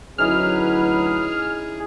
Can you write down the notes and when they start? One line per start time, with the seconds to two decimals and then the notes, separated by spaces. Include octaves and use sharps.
0.18 D2 F#3 C#4 D#4 E4 G#4 B4 F6